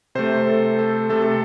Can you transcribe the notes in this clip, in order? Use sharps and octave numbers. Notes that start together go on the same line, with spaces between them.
C3 A3 C5
A4
A4
C3 A3 A4
A4